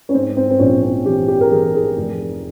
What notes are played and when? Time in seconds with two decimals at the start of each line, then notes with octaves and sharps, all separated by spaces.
0.09 C#4
0.14 G#2 C4
0.37 C4
0.50 C4
0.59 A#1 C#4
0.82 C4
1.05 E3 G4
1.28 G4
1.41 A#4
1.51 E3 G#4
1.74 G#4
1.96 F1